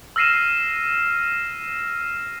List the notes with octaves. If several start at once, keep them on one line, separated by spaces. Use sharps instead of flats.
E6 F6 A#6 C7 D#7 E7